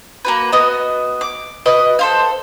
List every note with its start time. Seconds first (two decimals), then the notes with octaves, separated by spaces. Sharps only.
0.25 A#3 F#4 B4
0.52 B3 F#4 D#5
1.21 D6
1.66 F#4 B4 D#5
1.99 A4 C5 F5